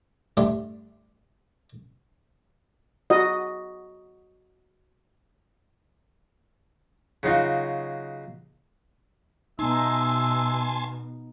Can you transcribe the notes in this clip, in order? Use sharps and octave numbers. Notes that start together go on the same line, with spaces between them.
G2 D3 A3 D4 G4 C6
F#4 D#5
C#3 F#3 D#4 F4 F#4
B2 B3 D#4 E5 G#5 A5 C6